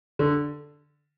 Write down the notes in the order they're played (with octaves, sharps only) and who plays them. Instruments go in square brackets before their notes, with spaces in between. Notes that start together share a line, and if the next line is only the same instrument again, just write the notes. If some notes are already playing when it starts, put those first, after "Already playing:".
[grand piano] D3